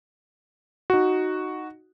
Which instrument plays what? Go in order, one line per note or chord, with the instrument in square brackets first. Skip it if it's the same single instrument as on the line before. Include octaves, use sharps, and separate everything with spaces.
[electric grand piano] D#4 F#4